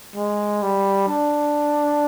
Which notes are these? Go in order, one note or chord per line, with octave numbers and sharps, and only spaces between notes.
G#3
G3
D4